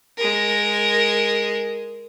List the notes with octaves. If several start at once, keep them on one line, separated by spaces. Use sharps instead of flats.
G#3 A#4